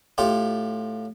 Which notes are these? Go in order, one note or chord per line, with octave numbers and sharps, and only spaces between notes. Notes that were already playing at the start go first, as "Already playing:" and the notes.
A2 F4 G4